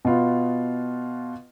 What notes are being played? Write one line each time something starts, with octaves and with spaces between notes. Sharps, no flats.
B2 B3 F4